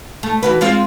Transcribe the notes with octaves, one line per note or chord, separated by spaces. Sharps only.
A3
E3 F#4 B4
G#3 C4 F4